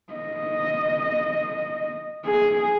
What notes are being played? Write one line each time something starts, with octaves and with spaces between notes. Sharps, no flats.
D#5
G#4